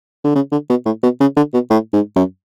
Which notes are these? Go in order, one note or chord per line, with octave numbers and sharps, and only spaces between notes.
D3
C#3
D3
B2
A2
B2
C#3
D3
B2
A2
G#2
F#2